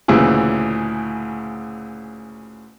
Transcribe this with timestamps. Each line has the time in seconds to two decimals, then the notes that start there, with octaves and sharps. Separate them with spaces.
0.08 D2 A#2 C#3 E3